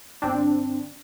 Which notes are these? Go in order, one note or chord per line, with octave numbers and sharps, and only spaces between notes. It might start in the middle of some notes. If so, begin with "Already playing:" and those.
G1 C4 D4